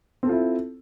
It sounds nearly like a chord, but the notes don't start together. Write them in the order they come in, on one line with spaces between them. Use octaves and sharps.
C4 A4 F4 E4